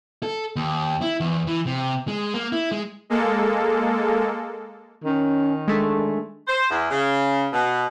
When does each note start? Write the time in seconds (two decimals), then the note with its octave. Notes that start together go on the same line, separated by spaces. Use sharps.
0.23 A4
0.56 D#2
1.02 E4
1.20 E2
1.47 E3
1.67 C3
2.08 G#3
2.34 A#3
2.52 E4
2.72 G#3
3.10 G#3 A#3 A4
5.04 D#3 C#4
5.68 G#3 A3 D4
6.46 C5
6.69 E2
6.89 C#3
7.52 B2